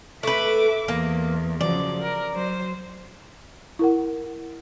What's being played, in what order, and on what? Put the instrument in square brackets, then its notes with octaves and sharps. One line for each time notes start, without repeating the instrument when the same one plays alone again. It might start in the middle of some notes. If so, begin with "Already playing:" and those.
[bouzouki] A3 B4 [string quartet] E5 D6
[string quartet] E2 [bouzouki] A#3
[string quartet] C#3 F3 F#3 [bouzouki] D5
[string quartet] A#4
F#3 C5
[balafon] E4 A#4 F#5